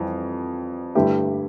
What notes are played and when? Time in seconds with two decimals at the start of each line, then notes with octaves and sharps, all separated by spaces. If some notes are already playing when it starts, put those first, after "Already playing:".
Already playing: F2 E3 G3
0.95 G2 D3 A3 E4 G4